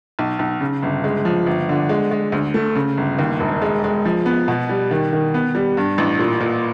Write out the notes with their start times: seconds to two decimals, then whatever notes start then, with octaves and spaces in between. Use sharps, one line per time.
0.19 B1
0.39 B1
0.60 C#3
0.83 G1
1.04 G#3
1.25 F3
1.46 G1
1.69 D3
1.89 G#3
2.11 G#3
2.32 D2
2.54 A3
2.75 C#3
2.97 G1
3.19 D#2
3.40 E1
3.62 G#3
3.84 G#3
4.05 F3
4.26 B3
4.48 B2
4.69 G3
4.91 D#3
5.13 D#3
5.34 B3
5.55 G3
5.77 G2
5.98 A1
6.19 A#2
6.40 A#2